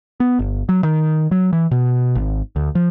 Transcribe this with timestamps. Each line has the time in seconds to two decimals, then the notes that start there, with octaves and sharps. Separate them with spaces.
0.20 B3
0.39 G1
0.69 F#3
0.83 D#3
1.31 F#3
1.53 E3
1.71 B2
2.15 G#1
2.56 D2
2.75 F3